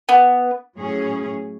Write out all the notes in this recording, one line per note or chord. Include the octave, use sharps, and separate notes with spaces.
B3
A2 F#3 C#4 G#4